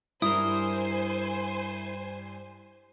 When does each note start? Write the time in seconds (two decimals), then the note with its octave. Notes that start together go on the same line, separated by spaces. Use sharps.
0.22 G2 E4 A#4 C5 G#5 D#6